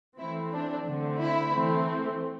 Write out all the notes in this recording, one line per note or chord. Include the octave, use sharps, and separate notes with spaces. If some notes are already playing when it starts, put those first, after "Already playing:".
E3 A3 C4 E4
D4
D3 A3 C4
E4
E3 A3 C4